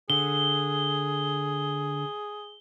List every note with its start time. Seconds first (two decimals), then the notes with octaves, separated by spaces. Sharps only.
0.10 D3 G#4 G7